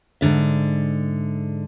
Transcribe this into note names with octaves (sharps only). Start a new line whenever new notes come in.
G#2 D3 E5